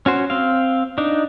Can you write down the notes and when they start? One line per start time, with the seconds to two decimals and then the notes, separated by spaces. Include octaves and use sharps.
0.06 C#4 F#4 C5
0.30 C4 F5
0.98 D4 D#4